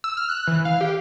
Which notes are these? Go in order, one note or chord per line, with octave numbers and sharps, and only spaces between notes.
E6
F6
F#6
E3
F5
G4